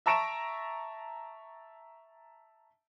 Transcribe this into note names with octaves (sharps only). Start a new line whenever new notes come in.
E5 A5 A#5 C#6 D7 E7